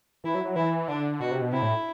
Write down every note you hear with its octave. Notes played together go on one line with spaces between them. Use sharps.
E3 E4
F#3
F#3
E3 E4
D3 D4
B2 F#4
C3
B2
C3 E4
A2